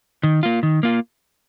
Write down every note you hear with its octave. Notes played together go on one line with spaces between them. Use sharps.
D#3
A#3 F4
D#3
A#3 F4